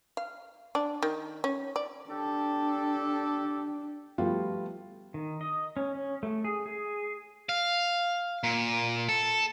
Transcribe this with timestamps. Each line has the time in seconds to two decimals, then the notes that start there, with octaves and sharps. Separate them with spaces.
0.17 F5
0.75 D4
1.03 D#3
1.44 C#4
1.76 D5
2.10 D4 G4 A4
4.18 F3 G3 A3 B3 F4 F#4
5.14 D#3
5.41 D#5
5.77 C#4
5.95 C#4
6.23 A3
6.44 G#4
6.66 G#4
7.49 F5
8.44 A#2
9.09 A4